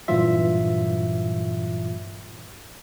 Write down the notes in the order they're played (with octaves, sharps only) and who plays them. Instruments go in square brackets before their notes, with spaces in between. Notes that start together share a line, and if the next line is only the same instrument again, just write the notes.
[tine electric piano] G2 A#2 E3 F#3 F4 E5